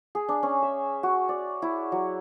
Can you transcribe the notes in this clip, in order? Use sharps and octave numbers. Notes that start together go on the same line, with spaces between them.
G#4
D4
C#4
E5
F#4
D5
E4
F#3